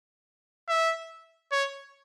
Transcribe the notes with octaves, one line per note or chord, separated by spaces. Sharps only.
E5
C#5